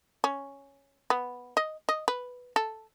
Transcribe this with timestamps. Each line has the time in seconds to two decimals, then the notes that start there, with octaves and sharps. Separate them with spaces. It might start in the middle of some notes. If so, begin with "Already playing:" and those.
0.24 C#4
1.10 B3
1.57 D#5
1.89 D#5
2.08 B4
2.56 A4